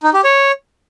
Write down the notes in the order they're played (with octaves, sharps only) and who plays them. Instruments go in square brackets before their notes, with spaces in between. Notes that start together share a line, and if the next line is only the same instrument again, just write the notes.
[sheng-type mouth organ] D#4
G4
C#5